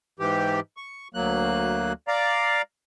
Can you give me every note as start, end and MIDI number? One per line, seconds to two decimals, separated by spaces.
0.19 0.60 44
0.19 0.60 52
0.19 0.60 67
0.77 1.08 85
1.14 1.93 38
1.14 1.93 54
1.14 1.93 58
1.14 1.93 90
2.08 2.62 74
2.08 2.62 77
2.08 2.62 82